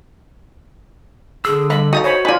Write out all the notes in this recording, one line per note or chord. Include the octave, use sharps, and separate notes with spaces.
D3 G#4 E6
G3 D#5 F5 B5
D#4 F#4 A4 F5 D#6
C5 C#5 G#5 B5
D#4 F4 D5 G#5 B5